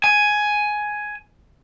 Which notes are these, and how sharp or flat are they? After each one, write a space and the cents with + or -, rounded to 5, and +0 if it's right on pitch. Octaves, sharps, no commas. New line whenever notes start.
G#5 +10